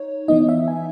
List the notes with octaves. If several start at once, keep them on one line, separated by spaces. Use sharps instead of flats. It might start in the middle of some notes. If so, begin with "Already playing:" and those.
Already playing: D#4 C#5
E3 B3 D#4 D#5
E5
G#5